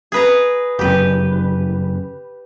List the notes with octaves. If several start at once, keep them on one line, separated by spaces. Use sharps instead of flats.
G#4 B4 A#5
G1 F#2 C#3 G4 B4